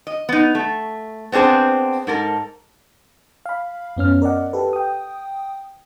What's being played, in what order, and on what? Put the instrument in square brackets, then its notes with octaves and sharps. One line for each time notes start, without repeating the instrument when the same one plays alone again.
[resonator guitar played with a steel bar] D#5
B3 D#4
A3
B3 C4 D4 G#4 C5
G#2 A4 A#4
[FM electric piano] F5 B5
F#2 B3 C#4 F6
A#4 D5 D#5 F#5
G4 A4 B4
G5 D#6